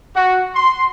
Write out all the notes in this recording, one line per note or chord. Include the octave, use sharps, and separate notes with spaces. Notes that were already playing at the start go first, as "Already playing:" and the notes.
F#4
C6